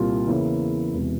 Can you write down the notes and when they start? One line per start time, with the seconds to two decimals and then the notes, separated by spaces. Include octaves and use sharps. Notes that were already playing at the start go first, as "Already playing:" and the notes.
Already playing: C2 A#2 G3 C4 F4
0.27 E2 C#3 E3 A#3 E4
0.94 E1 E2 C3